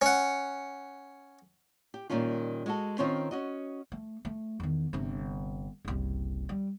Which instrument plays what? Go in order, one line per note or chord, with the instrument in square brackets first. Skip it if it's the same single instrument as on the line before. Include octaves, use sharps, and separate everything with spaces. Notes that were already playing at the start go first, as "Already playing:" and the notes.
[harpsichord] C#4 F#5
[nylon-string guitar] G4
A#2 D#3 G3 C#4 F4
G#3 F#4 A4
D#3 C4 C#4 F4 C5 C#5
C#4 F#4 D#5
[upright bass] A3
A3
E2 D#3
G1 C3
F#1 C2
G3